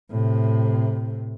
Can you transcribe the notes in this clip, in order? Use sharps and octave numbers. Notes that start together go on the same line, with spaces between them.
A2 C3